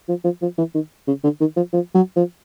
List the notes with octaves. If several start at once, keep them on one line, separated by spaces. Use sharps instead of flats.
F3
F3
F3
E3
D#3
C#3
D3
D#3
F3
F3
F#3
F3